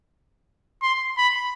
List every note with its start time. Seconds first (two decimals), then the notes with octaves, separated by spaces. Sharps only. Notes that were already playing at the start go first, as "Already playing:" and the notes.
0.82 C6
1.18 B5